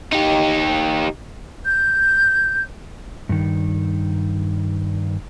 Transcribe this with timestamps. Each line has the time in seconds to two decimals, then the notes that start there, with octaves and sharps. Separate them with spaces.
0.13 D#4 G4
1.64 G6
3.29 G2 D#3